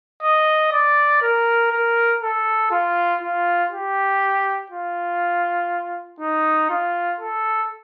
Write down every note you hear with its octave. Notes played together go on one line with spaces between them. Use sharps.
D#5
D5
A#4
A#4
A4
F4
F4
G4
F4
D#4
F4
A4